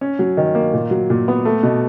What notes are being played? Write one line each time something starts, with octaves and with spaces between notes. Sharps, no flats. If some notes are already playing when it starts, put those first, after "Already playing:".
C#4
F#3
D#3
A#3
A#2
F#3
A#2
B3
A3
B2